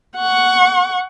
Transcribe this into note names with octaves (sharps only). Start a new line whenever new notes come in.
F#5 C#6